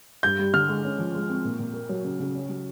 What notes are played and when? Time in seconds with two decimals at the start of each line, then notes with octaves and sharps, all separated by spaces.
0.23 G2 G6
0.39 G3
0.54 D3 F6
0.69 G#3
0.84 C#4
0.99 F3
1.14 G#3
1.29 C4
1.45 A#2
1.59 A#2
1.74 A#3
1.89 F#3
2.04 C#3
2.20 C#3
2.35 C#4
2.49 F#3